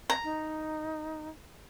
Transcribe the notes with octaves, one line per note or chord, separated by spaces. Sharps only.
A#5
D#4